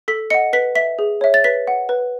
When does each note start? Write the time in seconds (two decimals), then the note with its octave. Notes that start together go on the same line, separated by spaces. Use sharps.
0.08 A4 B6
0.30 D#5 F#5 C#7
0.53 B4 B6
0.75 E5 B6
0.99 G#4
1.21 C#5 E5
1.34 A6
1.44 B4 B6
1.67 F#5
1.89 B4